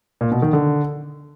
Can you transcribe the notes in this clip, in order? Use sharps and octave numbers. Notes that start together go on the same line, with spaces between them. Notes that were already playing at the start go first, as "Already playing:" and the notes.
A#2
B2
D#3
D3